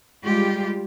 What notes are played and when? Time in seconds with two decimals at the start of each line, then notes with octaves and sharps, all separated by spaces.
0.25 G3 G#3 F4 G4